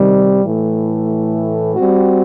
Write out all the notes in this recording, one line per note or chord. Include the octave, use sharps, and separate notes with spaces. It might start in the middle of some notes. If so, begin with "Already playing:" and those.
Already playing: C3 D#3 G3
A2 E3 A3
G3 C4 F#4